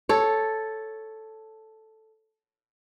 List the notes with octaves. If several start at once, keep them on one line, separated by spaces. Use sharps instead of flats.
A4 C#5